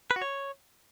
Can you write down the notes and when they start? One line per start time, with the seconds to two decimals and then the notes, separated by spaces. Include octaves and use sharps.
0.11 B4
0.16 F#4
0.22 C#5